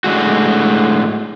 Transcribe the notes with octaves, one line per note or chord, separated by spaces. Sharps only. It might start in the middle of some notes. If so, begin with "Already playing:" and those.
A2 D3 G#3 F#4